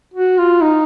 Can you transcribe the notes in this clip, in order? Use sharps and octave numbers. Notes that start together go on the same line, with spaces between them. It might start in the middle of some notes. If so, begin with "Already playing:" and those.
F#4
F4
D#4